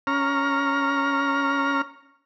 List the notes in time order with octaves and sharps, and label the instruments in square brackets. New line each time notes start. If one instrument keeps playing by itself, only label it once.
[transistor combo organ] C#4 A#5 F6